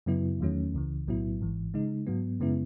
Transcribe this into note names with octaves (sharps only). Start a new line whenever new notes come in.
F#2 C#3 F#3 B3 E4
E2 D#3 F#3 A3 C#4
C#2 C#3 E3
B1 A2 F#3 B3 E4
G#1 G#2 E3
C#3 G#3 D#4
G#2 F#3 B3
F#2 C#3 G#3 B3 E4